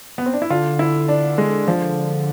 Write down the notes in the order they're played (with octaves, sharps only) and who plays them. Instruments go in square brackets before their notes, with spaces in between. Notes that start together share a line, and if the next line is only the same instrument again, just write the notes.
[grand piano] B3
C4
D4
E4
[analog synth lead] D3 [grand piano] F4
[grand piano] E4
D4
G#3
F3